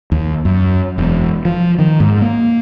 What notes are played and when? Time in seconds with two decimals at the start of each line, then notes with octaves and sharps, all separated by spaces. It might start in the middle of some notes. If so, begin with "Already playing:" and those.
0.12 D#2
0.45 F#2
0.98 E1
1.45 F3
1.79 D#3
2.00 G#2
2.21 A#3